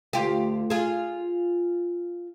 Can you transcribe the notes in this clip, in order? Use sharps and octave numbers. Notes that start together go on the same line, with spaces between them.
D2 F4 G4
F4 G#4